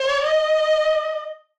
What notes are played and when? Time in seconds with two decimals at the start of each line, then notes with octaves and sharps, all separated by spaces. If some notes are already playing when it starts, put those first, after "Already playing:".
Already playing: C#5
0.23 D#5